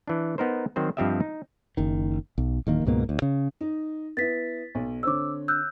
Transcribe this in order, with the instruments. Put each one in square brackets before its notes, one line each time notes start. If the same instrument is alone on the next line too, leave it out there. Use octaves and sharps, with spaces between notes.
[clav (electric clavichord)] E3 D4
B3 D#4 A#4 C5
D#3 F#3 C4 C5
G2 F3 C4 G4 D#5 E5
D#4
[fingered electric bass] F#1 D#3
B1
D1 D#3 A#3
C#2 G#2 B2 A#3
D2
C#3
[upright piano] D#4
[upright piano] B3 E4 [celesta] A6 B6
[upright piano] B1
[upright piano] D3 C4 C#5 [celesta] D6 E6
[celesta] E6 F#6 G6